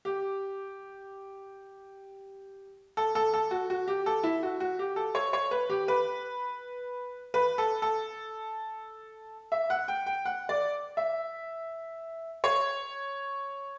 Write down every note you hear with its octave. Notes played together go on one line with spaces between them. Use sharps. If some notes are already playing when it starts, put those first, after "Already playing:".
G4
A4
A4
A4
F#4
F#4
G4
A4
E4
F#4
F#4
G4
A4
C#5
C#5
B4
G4
B4
B4
A4
A4
E5
F#5
G5
G5
F#5
D5
E5
C#5